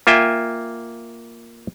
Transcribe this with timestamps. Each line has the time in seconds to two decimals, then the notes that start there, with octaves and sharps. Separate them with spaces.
0.07 A#3 F4 E5 G5 G#5